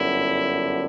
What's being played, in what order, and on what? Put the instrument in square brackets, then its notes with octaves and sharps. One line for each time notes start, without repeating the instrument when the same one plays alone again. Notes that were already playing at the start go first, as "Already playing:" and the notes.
Already playing: [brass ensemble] G1 F#2 D3 E4